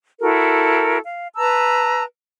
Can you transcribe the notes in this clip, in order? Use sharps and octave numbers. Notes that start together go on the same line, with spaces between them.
E4 F#4 A4 A#4
F5
B4 A5 A#5 E6